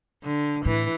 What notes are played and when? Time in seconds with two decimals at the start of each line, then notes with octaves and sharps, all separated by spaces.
0.24 D3
0.65 A2 E3